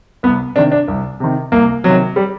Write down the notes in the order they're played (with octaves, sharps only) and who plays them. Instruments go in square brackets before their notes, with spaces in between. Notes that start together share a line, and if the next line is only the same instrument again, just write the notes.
[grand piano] C2 B3
C3 D4
D#3
D4
C2
C3 D#3
C2 A#3
C3 D#3 F#3
G3